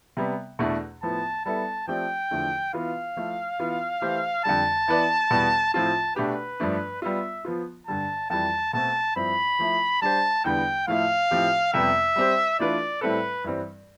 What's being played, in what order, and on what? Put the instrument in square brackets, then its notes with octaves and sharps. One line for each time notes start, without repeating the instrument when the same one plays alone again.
[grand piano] C3 G3 B3
E2 B2 A3 D4
[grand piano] A2 F3 B3 [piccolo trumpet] A5
[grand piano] G3 B3 E4 A4 [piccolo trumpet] A5
[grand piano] F3 A3 C4 G4 D5 [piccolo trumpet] G5
[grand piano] E2 D3 F3 A3
[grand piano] E3 B3 F4 B4 [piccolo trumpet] F5
[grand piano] F3 A3 E4
E3 B3 F4
E3 A3 E4 G4 C5
[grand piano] F2 D3 G3 [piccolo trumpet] A5
[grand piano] E3 B3 E4 B4 D5
E2 B2 G3 B3
[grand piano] A2 F3 C4 F4 [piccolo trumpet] A5
[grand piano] B2 A3 D4 G4 [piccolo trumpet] B4
[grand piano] G2 F3 A3 D4
[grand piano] G3 B3 F4 [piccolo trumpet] E5
[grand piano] F3 B3 F4
[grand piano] G2 D3 G3 [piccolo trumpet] A5
[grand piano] F2 E3 G3 [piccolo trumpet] A5
[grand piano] B2 A3 C4 [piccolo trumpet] A5
[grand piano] G2 F3 C4 E4 [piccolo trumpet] B5
[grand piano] F3 A3 E4
[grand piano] G3 D4 G4 C5 [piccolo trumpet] A5
[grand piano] E2 D3 G3 B3 [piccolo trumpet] G5
[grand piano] A2 F3 A3 E4 [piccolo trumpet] F5
[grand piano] A2 F3 C4 G4
[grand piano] F2 C3 G3 B3 [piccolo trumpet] E5
[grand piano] G3 C4 G4 C5
[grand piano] E3 A3 D4 F4 B4 [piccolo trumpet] D5
[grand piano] A2 G3 C4 E4 A4 [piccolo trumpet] B4
[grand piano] G2 E3 G3 C4